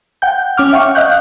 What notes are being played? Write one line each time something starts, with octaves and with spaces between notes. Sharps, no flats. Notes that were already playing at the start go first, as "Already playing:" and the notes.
F#5 G5 G6
C#4 D6 F6
E5 F#5 G5 C#6
D#5 F5 F#6 G6